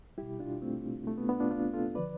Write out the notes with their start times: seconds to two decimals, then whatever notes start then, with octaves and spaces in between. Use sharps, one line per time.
0.18 B2 G3 E4 G4
0.39 D4 F4
0.62 A3 C4
1.07 A3
1.18 B3
1.29 B3 D4
1.40 D4 F4
1.51 D4 F4
1.74 F4 A4
1.95 D3 F3 B4 D5